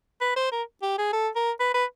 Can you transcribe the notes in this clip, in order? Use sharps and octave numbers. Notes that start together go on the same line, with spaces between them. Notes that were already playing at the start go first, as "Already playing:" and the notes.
B4
C5
A#4
G4
G#4
A4
A#4
B4
B4